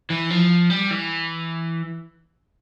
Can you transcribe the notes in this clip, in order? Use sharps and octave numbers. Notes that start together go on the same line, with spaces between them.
E3
F3
G3
E3